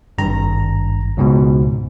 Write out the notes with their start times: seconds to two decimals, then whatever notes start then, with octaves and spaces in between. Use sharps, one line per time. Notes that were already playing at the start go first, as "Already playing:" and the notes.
0.18 G#1 G2 A#5
1.17 C#2 G#2 B2